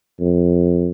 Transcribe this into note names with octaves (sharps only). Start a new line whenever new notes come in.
F2